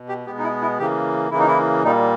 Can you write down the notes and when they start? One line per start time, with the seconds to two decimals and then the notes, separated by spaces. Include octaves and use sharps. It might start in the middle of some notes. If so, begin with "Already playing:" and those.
Already playing: B2
0.08 G4
0.26 B2 G#3 B3 G4
0.38 D#4
0.43 E4
0.62 E4
0.79 C#3 E3 A#3 G4
1.31 C#3 E3 A#3 E4
1.39 D#4
1.47 E4
1.84 A#2 G3 A#3 D#4